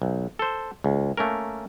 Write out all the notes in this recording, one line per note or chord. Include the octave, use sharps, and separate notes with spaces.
B1
A4 C5
C#2
A3 A#3 C#4 A#4